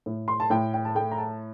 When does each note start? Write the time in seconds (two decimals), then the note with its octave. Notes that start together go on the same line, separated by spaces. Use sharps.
0.06 A2
0.28 C6
0.40 A5
0.50 A2 G5
0.74 G5
0.85 A5
0.95 A3 G5
1.12 A#5
1.18 A5